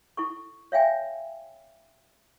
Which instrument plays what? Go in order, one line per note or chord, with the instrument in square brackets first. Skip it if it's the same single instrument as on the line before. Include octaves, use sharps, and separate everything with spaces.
[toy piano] E4 A4 C#6
C#5 E5 F5 G5 G#5